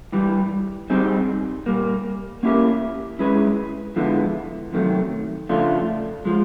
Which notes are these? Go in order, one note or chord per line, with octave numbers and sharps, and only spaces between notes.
G2 E3 G3
G3 C4 D#4 G#4
A#2 G3 A#3
A#3 C#4 E4 G4 A#4
G#3 C#4 E4 G#4 B4
D3 F3 G#3 B3 E4
F2 C3 D#3 F#3 A3
C#3 F3 A3 D4 F4
F3 G#3